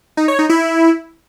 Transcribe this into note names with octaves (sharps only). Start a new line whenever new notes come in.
D#4
C#5
D#4
E4